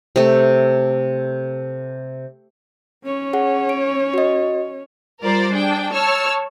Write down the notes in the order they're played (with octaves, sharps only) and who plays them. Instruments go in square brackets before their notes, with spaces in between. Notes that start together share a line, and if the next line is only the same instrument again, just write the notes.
[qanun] C3 A3
[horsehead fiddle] C#4 C#5
[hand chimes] G#4 F#5
D7
F#4 D#5
[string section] G3 F4 A#4 C5 D5
D4 G#4 G5
C#5 A5 E6 F6